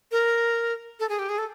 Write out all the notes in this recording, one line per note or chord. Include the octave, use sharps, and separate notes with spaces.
A#4
A4
G#4
G4
G#4
A4